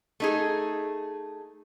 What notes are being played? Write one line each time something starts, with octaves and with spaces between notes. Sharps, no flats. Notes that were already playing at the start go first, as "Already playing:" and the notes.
A3 D#4 G#4